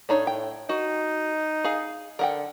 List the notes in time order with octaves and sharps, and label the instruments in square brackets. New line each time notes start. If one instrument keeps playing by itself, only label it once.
[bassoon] A2 [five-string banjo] D4 D#4 C#5
[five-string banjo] G5
[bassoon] D#4 [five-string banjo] F#4
[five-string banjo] G#4 F5
[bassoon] D3 [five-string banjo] A#4 F#5 G5